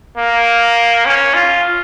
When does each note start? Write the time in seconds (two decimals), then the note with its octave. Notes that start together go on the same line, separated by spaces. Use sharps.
0.17 A#3
1.06 C#4
1.34 F4